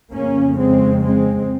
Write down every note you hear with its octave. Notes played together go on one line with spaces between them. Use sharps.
F2 C#3 A#3 C#4
G#3 C4
G#3 C4